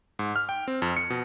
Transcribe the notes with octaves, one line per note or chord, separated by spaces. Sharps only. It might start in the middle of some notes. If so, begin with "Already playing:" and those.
G#2
F6
G5
C4
F2
C#7
B2